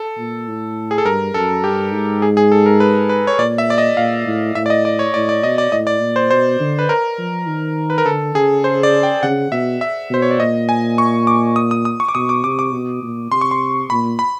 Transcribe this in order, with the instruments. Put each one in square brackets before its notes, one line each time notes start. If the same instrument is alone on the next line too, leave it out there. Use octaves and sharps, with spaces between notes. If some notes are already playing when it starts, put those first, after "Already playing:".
Already playing: [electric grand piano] A4
[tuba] A#2
A2
[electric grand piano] G#4
A4
[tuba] G2 [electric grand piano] A#4
[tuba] F#2 [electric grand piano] A4
[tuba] G2 [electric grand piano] G4
[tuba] G#2
[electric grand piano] G#4
G#4
A4
A#4
B4
B4
C#5
[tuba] A#2 [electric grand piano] D5
[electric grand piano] E5
D5
D#5
[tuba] A#2 [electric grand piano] F5
[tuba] A2
[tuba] A2 [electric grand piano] E5
[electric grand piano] D5
D#5
D5
C#5
[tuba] A2 [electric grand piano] D5
[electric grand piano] D5
[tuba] B2 [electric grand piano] D#5
[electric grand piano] D5
[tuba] A2 [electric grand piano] D#5
[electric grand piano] D5
[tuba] A#2
[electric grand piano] C5
[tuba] B2 [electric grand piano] C5
[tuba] D3
[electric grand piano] B4
A#4
[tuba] F3
D#3
[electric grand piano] B4
A#4
[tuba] D3 [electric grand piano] A4
[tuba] C#3 [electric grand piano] G#4
[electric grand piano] C5
D5
G5
[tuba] C#3 [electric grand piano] F#5
[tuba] B2 [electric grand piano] E5
[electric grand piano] E5
[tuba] B2 [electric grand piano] C5
[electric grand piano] C#5
D5
[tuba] A#2 [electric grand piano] D#5
[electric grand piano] G#5
C#6
D6
D#6
D#6
D#6
C#6
D6
[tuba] B2 [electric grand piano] D#6
[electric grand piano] D6
[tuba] C3 [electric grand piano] D6
[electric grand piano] D6
[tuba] B2
A#2
[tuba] C3 [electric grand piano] C6
[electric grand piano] C#6
C6
[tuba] A#2 [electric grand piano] B5
[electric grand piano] B5